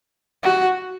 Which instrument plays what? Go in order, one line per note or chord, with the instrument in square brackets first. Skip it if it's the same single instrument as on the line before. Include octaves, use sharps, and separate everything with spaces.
[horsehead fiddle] F#4